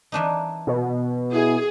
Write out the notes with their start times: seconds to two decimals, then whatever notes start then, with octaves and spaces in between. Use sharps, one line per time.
0.12 E3 D4 D#4
0.67 B2
1.33 E4 G#4